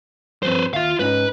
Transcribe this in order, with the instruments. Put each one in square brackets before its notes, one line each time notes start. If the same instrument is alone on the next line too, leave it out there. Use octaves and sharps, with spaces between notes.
[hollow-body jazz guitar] G2 F3 C4 [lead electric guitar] B4 C5
[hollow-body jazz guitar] D#2 E5 [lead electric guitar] F4 F5
[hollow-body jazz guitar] G#2 C#4 D#4 [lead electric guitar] B4